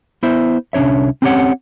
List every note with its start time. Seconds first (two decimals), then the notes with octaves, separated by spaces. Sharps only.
0.23 B3 E4 C5 E5
0.73 C2 C#4 D4 C#5 E5
1.22 C4 C#4 G4 A4 C#5 F#5